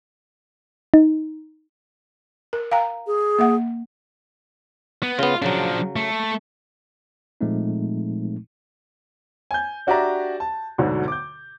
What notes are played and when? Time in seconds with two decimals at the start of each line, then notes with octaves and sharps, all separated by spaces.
0.94 D#4
2.53 A#4
2.71 F5 G5 A#5
3.07 G#4
3.39 A#3 E5 F#5
5.03 B3
5.19 C#3 B3 F4
5.42 C#3 F3 F#3 D4
5.96 A3
7.41 A#2 F3 G#3 A3 C4 D#4
9.51 G#5 G6
9.87 D4 F#4 G4 D5 E5 A#5
10.40 A5
10.78 D2 G#2 B2 D3 F#3
11.08 D6 G6